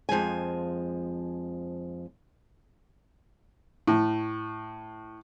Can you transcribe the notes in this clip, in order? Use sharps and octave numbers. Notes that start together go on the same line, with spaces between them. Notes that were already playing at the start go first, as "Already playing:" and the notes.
F2 F3 G#3 G#5
A2